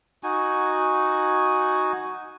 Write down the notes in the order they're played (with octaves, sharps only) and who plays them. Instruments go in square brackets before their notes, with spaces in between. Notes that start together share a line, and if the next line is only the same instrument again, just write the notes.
[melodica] D#4 F#4 G#5